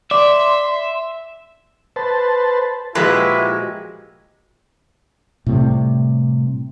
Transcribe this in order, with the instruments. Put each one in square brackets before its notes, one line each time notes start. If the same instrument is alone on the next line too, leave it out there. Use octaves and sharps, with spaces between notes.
[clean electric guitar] D5 [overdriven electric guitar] E5 [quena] C6
[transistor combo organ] B4 C5 A5
[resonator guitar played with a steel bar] A#2 F3 G#3 [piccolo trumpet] E4 [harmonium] F#4 G4 [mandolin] B4
[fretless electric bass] A2 C3 G3